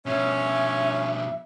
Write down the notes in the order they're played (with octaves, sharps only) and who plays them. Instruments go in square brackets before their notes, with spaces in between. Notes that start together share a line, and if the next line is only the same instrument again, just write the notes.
[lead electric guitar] B2 F3 [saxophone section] C#4 [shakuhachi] E5